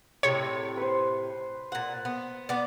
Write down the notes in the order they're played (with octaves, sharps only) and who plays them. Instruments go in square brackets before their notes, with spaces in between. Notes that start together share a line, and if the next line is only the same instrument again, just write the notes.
[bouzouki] A2 C3 [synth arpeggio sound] C#5
[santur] B4 C5
[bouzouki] A#2 F#5
B3
B3 D5